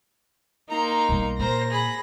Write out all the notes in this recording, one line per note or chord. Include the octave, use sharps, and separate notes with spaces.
A#3 D#4 A#5 C6
B1 G3
A#2 A#4 C5 A#6
G#4 B5